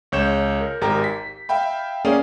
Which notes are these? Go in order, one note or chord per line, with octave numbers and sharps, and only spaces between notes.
C#2 C#5 G6 E7
A#4
G#1 G4 A#4 A#5
B6
E5 F5 G5 B5
A#3 C#4 G#4 D5 F5